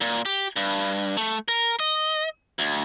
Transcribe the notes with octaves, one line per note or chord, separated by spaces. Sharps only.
A#2
G4
G2
A3
A#4
D#5
D2